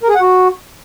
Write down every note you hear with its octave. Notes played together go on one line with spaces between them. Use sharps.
A#4
G#4
F#5
F#4